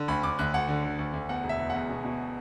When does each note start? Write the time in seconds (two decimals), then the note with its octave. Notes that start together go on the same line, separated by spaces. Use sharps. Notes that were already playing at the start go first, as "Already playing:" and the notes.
Already playing: D3
0.08 D2 B5
0.23 D2 D6
0.39 D2 F#6
0.54 D2 F#5
0.68 D3
0.84 D3
0.99 D2
1.13 D2
1.29 E2 F#5
1.44 E1
1.49 E5
1.59 E2
1.70 E2 F#5
1.89 B2
2.04 B2